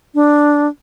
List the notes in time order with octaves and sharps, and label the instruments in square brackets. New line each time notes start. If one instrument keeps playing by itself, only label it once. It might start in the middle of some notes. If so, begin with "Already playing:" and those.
[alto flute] D4